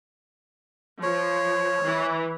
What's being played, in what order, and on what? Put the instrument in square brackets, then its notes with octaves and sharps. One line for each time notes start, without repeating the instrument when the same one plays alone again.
[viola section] F3 [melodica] C#5
[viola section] E3